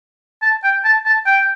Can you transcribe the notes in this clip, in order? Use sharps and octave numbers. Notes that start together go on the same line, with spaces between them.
A5
G5
A5
A5
G5